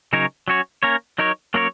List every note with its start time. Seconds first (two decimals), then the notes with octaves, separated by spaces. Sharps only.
0.13 C#3 F#3 D#4 A#4 C#5
0.48 F#3 C#4 F#4 C#5
0.83 A#3 C#4 A#4 C#5
1.18 F#3 D#4 A#4 C#5
1.54 F#3 A#3 C#4 A#4 C#5